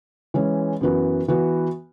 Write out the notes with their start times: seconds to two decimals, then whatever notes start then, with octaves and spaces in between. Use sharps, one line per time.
0.34 E3 G#3 C#4
0.81 F#2 E3 B3 F#4
1.28 E3 B3 F#4